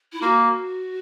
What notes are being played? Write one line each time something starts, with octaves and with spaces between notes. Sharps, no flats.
E4
A#3 F#4